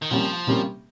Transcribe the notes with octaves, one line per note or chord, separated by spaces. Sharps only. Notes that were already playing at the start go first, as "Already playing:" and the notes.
D#3
C3 F3 G3 A#3 C#4 G4
C3 G3 A#3 C#4 G4